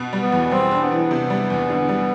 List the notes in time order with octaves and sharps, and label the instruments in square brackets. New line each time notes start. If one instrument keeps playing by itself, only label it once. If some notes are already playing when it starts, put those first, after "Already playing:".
Already playing: [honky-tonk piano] B2
G3
[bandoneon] B3
[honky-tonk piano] E2
[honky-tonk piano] G3 [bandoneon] C4
[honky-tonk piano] D4
[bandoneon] B3
[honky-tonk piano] E3
C3
G3
E2
D3
G3